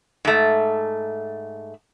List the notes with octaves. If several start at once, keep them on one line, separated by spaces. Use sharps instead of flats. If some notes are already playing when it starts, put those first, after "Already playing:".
G#2 A3